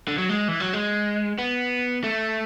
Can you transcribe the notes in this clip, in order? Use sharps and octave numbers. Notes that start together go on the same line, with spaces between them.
D3
F#3
G#3
E3
F#3
G#3
B3
A3